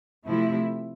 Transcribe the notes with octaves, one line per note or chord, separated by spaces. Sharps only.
C3 F3 A3 E4